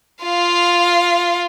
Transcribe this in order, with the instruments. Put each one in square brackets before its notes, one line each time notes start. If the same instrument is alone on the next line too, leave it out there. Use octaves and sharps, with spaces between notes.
[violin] F4 F5